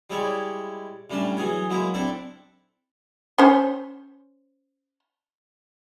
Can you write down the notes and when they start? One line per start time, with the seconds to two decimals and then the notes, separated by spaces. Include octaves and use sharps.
0.10 G3 G#3 E4 C#5 D5
1.10 A2 G3 C#4 D4 A5
1.37 E3 F#3 G#4 C#5
1.70 F#3 G#3 A#3 E4
1.94 C4 D4 E4 A4
3.38 C#4 C5 C#5